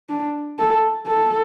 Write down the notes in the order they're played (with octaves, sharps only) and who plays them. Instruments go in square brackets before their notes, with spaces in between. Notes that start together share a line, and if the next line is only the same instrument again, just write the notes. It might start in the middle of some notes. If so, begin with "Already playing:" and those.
[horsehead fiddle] D4
A4
A4